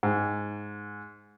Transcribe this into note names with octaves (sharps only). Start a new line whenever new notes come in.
G#2